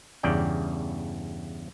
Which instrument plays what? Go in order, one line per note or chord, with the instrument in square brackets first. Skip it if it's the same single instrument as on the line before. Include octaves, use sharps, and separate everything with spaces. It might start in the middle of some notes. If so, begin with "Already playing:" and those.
[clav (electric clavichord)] E2 G2 C#3 D5 G5